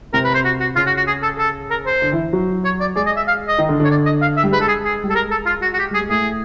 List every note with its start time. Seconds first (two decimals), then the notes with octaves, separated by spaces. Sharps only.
0.13 C3 C4 A#4
0.24 B4
0.34 C5
0.45 F#4
0.60 F#4
0.76 C#3 C#4 F4
0.87 F#4
0.97 F#4
1.07 G#4
1.23 A4
1.39 A4
1.70 A#4
1.86 C5
2.02 D3 D4
2.12 E3 E4
2.33 F#3 F#4
2.65 C#5
2.80 D5
2.96 G#3 G#4 D5
3.06 D#5
3.16 E5
3.28 F5
3.48 D#5
3.58 D#3 D#4
3.69 D3 D4
3.80 D3 D4 C#5
3.90 D5
4.05 D#5
4.22 F5
4.37 E5
4.43 G3
4.52 G#3 B4
4.61 A4
4.68 G#4
4.84 G#4
5.04 G3
5.10 A4
5.15 G#3 A#4
5.31 A4
5.46 F4
5.62 F#4
5.74 F#4
5.79 G4
5.91 G3 G#4
6.00 G#3
6.09 A2 A3 G#4